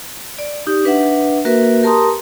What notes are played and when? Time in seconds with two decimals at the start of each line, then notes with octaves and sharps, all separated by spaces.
0.39 D5
0.67 D#4 G4
0.84 D4 B4 E5 F#5
1.45 A#3 F#4 A#4 B4 E5
1.83 G4 A#4 A5 A#5 C6 D#6